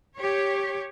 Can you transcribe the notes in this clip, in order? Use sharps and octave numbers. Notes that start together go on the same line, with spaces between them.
G4 C#5